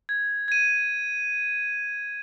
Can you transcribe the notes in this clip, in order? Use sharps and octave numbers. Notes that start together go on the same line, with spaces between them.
G#6
G#6 D#7